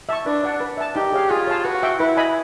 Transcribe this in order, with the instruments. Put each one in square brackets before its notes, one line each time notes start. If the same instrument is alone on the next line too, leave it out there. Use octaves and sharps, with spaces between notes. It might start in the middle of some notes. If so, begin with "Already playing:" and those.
[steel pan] E5 A5 C#6
[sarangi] D4 [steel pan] B4
[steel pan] D5 F#5 A5
B4
E5 A5
[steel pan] D#4 [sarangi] G4
[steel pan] G#4 C#5 F5
[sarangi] F4 [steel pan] G#4
[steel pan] C#5 F5 A5
[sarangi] F#4 [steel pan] B4
[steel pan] E5 G5
[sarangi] E4 [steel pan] B4
[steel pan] D#5 G#5 B5